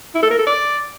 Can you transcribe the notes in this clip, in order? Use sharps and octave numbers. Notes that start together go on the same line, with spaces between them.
E4
A4
A#4
A4
D5